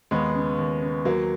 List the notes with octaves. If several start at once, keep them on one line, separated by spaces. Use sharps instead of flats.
D#2 G#3 B3
C#3
D#2
C#3
D#2 F#3 A#3